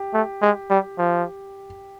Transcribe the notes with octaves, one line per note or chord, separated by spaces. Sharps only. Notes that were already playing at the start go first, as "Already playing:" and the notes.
Already playing: G4
A3
G#3
G3
F3